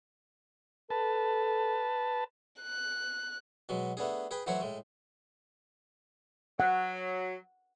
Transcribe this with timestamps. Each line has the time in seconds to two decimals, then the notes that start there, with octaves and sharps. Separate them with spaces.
0.90 A4 B4 A5
2.62 F#6
3.69 B2 F#3 G#3
3.97 A3 B3 D4 G#4
4.31 G#4 B4 G5
4.46 E3 F#3 A3 F#4 C5 C#5
4.61 A2 G#3
6.60 F#3 F#5